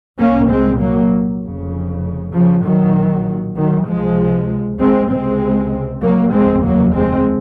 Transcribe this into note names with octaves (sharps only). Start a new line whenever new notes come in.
C2 A#2 A#3 C#4
G#3 C4
F#3 A#3
F1 F2 C#3
C#3 F3
A#1 A#2 D#3 F#3
D#3 F#3
C#2 C3 F3 G#3
G#3 C4
C#2 C3 G#3 C4
F#3 A#3
F1 D#2 C#3 G#3 C4
F#3 A#3
G#3 C4